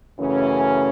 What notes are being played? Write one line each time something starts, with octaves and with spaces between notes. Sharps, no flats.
F#2 C#3 E3 A3 C#4